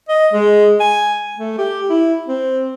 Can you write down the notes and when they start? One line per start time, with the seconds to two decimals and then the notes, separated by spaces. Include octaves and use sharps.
0.09 D#5
0.33 G#3
0.80 G#5
1.38 A3
1.58 G4
1.90 E4
2.27 C4